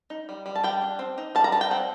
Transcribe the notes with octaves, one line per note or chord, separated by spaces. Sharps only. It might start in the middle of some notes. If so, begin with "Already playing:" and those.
D#4
G3
G3
A5
G3 G5
D4
C4
D#4
G3 A5
A#5
G3 A5
G5
C4 F#5